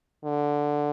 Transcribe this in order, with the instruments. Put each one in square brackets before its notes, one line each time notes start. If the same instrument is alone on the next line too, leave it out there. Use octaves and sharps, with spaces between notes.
[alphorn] D3